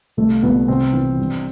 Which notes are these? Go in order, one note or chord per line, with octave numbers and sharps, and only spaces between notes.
C2 A3
C2 B3
C3 C4
E3
G2